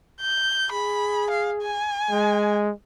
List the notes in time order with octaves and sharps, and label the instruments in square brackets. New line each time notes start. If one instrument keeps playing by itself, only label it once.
[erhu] G6
[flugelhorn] G#4 [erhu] B5
[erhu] F5
G#5
[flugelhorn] G#3